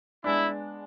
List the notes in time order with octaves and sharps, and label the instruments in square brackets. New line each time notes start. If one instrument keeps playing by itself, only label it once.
[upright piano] G#3 B3 D4 [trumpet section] E4